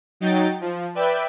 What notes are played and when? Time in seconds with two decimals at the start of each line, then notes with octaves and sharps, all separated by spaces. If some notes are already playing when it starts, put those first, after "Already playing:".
0.20 F#3 D#4 G5 A6
0.61 F3
0.95 B4 D5 E5 G5